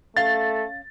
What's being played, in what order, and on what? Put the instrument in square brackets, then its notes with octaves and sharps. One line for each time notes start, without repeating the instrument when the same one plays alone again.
[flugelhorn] A3 [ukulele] C#4 F5 [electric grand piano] A6